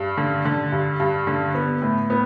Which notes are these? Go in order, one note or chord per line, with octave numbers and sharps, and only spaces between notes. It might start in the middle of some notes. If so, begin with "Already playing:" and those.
Already playing: G2
D3
D3
G2
G2
D3
B3
A2
B3